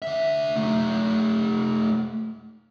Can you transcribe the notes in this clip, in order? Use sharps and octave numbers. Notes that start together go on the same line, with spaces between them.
D3 E5
A3 D#4